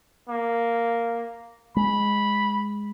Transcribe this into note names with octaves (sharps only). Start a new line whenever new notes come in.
A#3
G#3 B5